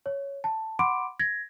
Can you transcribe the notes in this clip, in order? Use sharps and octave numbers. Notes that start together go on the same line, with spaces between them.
C#5
A5
F#5 B5 C6 D6 D7
G#6 A#6